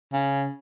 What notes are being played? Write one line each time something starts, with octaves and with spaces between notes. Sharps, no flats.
C#3